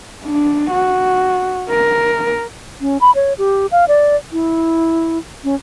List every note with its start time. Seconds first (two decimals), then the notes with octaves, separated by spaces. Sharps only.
0.24 D4
0.72 F#4
1.70 A#4
2.81 C#4
3.01 B5
3.15 C#5
3.38 G4
3.72 F5
3.88 D5
4.32 E4
5.44 C#4